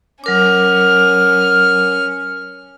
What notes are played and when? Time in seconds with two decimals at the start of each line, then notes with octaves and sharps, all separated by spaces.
0.24 F#3 C#4 A#4 D6 F6